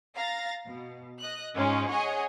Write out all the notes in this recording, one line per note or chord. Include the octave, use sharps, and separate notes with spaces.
F5 A#5 A6 A#6
B2
D#5 F#6
G#2 G#3 C#4 D#4 F4
G#4 C#5 D#5 F#5 G#5